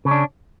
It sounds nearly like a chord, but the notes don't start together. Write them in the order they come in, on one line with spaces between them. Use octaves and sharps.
C#3 C#4 D4